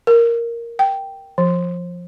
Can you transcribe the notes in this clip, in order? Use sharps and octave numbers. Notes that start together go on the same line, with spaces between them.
A#4
G5
F3